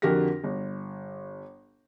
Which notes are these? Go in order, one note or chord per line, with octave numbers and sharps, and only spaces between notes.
F2 D3 F#4 G4 A#4 A#6
G1